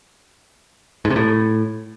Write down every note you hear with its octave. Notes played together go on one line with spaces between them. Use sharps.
G#2
C3
A2